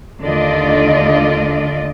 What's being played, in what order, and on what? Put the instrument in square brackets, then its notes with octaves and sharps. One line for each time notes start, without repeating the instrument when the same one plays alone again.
[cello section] D#2 D3 A3 F4 D5 D#5